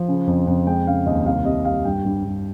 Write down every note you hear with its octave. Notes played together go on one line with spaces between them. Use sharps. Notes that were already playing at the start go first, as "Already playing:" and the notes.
Already playing: F3
C#3
F2
F2
G#3 G5
C#3 F5
D#2 D#5
C2 F5
C3 D#5
G3 F5
G2 G5
G2
G2